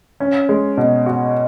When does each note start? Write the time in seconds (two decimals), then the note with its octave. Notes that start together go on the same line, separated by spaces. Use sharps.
0.20 C#4
0.49 G#3
0.77 B2
1.06 F#4